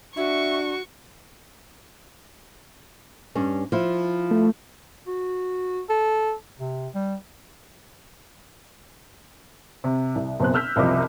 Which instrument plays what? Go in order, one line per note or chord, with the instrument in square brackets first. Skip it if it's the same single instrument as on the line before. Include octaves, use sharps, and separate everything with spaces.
[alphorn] D4 [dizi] F#4 [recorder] E5 [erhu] C#6
[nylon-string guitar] G2 C#4
F3 E4
[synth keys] A3
[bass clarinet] F#4
A4
C3
G3
[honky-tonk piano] C3
C2
F#1 B2 C4 F#6
E6 F6 G6 B6
F#1 C2 C3 F3 D#5 D6